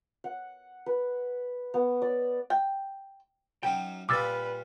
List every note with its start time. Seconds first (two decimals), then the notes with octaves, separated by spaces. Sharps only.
0.24 F#5
0.86 B4
1.74 B3
2.02 D5
2.50 G5
3.63 F#2 F#3 D#4 G5
4.09 A#2 G3 F4 B4 D6 E6 A6